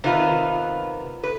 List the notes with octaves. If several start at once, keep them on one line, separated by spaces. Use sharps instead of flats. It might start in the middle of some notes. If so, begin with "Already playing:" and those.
C3 D#3 B3 F4 B4
B4